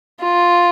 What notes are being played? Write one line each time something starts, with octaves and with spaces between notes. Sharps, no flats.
F4